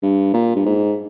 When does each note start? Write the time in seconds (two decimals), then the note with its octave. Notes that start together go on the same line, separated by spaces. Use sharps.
0.03 G2
0.33 A#2
0.56 G2
0.65 G#2